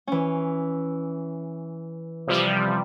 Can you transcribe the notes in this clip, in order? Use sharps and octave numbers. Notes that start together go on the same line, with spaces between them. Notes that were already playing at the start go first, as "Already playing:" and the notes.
E3 C#4
C3 F3 G3